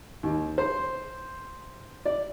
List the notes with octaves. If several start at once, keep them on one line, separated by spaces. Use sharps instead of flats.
D#2
C5
D5